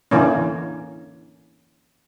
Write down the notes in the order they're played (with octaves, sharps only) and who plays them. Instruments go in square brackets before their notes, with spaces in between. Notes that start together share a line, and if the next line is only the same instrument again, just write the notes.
[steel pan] D3 E3 A#3 C#4